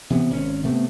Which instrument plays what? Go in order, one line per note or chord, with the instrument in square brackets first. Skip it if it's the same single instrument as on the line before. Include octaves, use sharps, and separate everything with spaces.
[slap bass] C3 E3 B3
G#1 C#4
C3 A3 B3